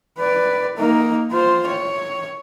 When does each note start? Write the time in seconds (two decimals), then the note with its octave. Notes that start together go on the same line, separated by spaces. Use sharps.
0.18 B4 D5
0.77 A#3 D#4
1.31 F4 C5
1.67 C#5